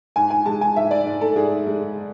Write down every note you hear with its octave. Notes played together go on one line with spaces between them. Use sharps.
G#2 G#5
G#5
G#3 A5
G#5
G#2 E5
D5
G#2
A4
G#2 G#4
G#3